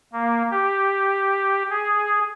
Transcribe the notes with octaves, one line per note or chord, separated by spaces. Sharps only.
A#3
G4
G#4